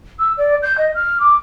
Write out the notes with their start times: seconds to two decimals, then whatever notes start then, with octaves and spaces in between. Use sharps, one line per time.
0.20 E6
0.37 D5
0.63 G6
0.78 D#5
0.95 F6
1.20 D6